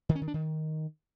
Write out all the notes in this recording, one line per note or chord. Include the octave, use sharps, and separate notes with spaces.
D#3
C#4
D#3
D4
D#3